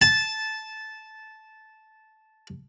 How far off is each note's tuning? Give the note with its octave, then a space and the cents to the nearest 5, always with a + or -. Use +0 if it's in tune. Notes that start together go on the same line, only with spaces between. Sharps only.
A5 -10